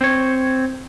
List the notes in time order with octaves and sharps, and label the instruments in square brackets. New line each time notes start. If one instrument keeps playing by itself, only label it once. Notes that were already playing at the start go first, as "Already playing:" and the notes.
[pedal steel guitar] C4 C#5